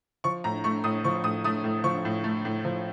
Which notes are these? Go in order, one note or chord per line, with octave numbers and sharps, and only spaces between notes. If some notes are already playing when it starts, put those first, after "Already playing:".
F3 C#6
A2 A#5
A3 C#6
A2 D#6
F3 C#6
A2 D#6
A3 D#6
A2
F3 C#6
A2
A3
A2
F3